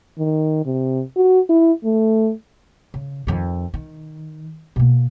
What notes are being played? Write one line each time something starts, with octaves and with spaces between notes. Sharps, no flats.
D#3
C3
F#4
E4
A3
C#3
F2 D#3
D#3
B2 A#3